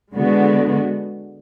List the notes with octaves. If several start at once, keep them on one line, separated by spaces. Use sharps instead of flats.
D3 G#3 B3 F#4